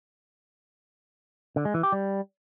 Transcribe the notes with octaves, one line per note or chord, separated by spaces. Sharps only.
D3
G#3
E3
G4
G3